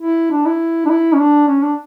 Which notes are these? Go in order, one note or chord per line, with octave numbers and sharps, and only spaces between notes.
E4
D4
E4
D4
E4
C#4
D4
C#4
D4